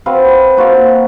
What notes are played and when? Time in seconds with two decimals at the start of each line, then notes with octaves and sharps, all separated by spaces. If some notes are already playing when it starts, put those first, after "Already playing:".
0.06 C4 F#4 B4 F5
0.57 A#3 F#4 C5 F5